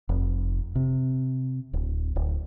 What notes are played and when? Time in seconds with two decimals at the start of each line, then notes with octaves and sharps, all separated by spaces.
0.09 F1
0.75 C3
1.73 D1
2.16 D1